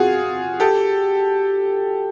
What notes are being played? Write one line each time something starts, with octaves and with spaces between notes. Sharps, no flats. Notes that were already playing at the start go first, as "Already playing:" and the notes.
Already playing: F4 F#4 G#4
G4 A4